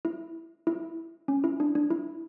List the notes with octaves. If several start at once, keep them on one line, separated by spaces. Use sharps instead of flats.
E4
E4
C#4
E4
D4
D4
E4